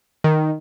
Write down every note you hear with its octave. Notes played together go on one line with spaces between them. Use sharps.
D#3